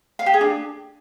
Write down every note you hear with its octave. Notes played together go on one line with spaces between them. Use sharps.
F5
G4
G#4
D4